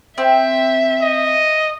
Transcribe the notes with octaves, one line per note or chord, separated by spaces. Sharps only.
C4 E5
D#5